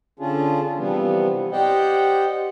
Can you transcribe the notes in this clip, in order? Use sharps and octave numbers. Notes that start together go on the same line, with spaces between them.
D3 C#4 D4 F4 G#4
C3 E3 F3 G3 B3
G4 C5 D5 D#5 F#5 G5